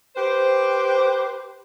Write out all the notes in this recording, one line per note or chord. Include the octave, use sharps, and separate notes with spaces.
G4 B4 C5